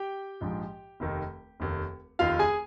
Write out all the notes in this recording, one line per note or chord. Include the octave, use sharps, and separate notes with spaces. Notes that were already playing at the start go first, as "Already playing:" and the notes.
Already playing: G4 G5
A#1 G#2 F3
F1 D#2 D#3
F1 D#2 D#3
F1 D#2 D#3 F4 F5
G#4 G#5